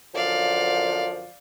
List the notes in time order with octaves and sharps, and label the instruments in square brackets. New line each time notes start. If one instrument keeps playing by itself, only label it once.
[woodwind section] F#2 D3 F3 [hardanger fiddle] D5 F5